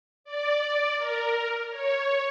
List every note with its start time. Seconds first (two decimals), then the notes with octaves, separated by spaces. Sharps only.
0.24 D5
0.97 A#4
1.71 C#5